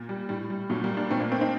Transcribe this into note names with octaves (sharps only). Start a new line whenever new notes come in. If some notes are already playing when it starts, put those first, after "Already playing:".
Already playing: A#2
G3
A2 G3
G3
A#2 F#3 A3
G3 A#3
A#3 D4
A#2 A3 C4
A#3 D4
A3 C4
C4 D#4